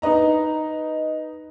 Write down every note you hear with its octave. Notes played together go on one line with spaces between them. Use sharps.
D#4 B4 D#5 A#5